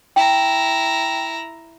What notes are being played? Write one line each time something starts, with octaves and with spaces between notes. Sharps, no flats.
E4 G5 A#5